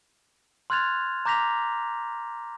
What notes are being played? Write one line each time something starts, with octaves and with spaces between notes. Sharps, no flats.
C6 F6 F#6 G#6 A6 F7
A#5 D6 G6 A#6 B6 F7